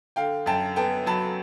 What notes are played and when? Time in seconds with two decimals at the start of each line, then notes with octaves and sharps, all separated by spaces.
0.16 D3 F5 G5
0.46 F#2 G5 A5
0.76 B3 G5 A5
1.06 F#3 A5 B5